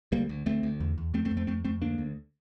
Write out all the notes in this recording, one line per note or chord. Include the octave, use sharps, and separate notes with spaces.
D2 G3 A#3
D2
D2 A3 C4
D2
E2
E2
F2 A3 C4
A3 C4
F2
A3 C4
F2 A3 C4
F2 A3 C4
D2 A#3 D4
D2